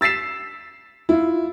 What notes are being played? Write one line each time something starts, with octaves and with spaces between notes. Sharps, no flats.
E6 A6 B6 C7 E7
E4 F4